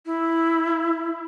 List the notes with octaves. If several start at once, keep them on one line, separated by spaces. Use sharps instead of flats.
E4